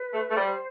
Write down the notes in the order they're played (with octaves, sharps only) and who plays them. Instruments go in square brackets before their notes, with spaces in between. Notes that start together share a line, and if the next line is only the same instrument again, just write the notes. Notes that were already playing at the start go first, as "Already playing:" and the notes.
Already playing: [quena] B4
[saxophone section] A3
A3
[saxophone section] G3 [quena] C5